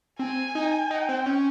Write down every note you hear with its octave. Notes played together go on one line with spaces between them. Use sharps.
C4 G#5
D#4
D#4 G5
C4
C#4